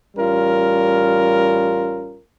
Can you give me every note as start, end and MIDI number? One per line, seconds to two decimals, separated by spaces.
0.16 2.19 33
0.16 2.19 55
0.16 2.19 61
0.16 2.19 65
0.16 2.19 70